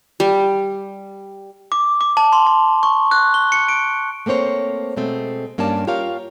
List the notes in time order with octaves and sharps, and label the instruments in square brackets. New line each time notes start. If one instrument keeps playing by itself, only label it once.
[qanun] G3
[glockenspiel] D6
D6
A5
C6
A5
C#6
F#6
G7
C#7
D7
[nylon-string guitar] A3 A#3 C4 C5 C#5
B2 G#3 A3 C4
G2 A#3 C#4 D5 A5
F4 G4 A#4 C#5 F5